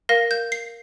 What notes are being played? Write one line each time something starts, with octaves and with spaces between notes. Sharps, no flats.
A#4 F5 A#6
G6
C7